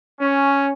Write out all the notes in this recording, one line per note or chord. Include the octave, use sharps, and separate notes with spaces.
C#4